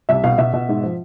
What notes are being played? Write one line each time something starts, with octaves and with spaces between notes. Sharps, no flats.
C2 E5
B2 F5
B2 E5
B2
G#2
F3